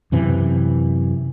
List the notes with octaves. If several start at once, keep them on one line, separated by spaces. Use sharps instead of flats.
F#2 C3 E3